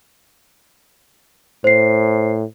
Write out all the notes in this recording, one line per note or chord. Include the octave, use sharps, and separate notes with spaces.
A2 C5 C7